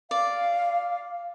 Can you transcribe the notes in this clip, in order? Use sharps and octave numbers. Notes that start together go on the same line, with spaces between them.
D5 F5